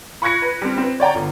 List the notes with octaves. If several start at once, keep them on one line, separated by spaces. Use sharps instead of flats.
B5 C#6 F#6 G#6 A#6 C#7
B4
G3 C4
C4 B4
C#5 D5 G5 A#5
G1